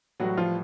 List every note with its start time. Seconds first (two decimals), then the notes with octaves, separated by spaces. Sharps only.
0.20 A2 E3 F#3 G3 F#4
0.37 F3 F4